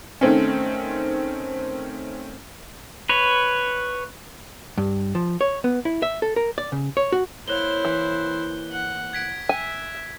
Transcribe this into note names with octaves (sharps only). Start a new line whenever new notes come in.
D#3 A3 C4 C#4
B4 C#5
G2
F3
C#5
B3
E4
E5
A4
A#4
D5
C#3
C#5
F#4
A#3 E4 C5 C#5 F5 F#6 G7
E3
F#5
G#6 B6 D7
E5 G#5